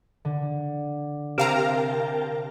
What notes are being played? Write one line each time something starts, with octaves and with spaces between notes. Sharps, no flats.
D3
C3 A#4 F5 G5 A5 A#5